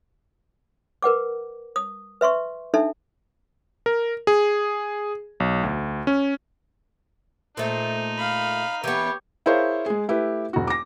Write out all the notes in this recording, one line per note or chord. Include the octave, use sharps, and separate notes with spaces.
A#4 B4 F#5 D6
D#6
B4 E5 C6 C#6
D4 D#4 A4 E5 A5
A#4
G#4
B1
D2
C#4
A#2 A3 D#4 C5
F5 B5
E3 B3 G4 C#5
E4 G#4 A#4 C5 C#5 F5
G#3 G#4
A3 E4 G4 B4
E1 F#4
D6 A#6